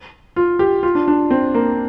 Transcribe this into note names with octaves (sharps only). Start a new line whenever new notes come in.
F4
G4
F4
D4
D4
C4
A#3